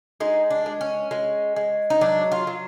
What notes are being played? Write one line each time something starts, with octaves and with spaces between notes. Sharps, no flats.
G#3 D#4
D4
G#3
C#4
G#3
G#3
D#4
F#3 D4
F4
F#3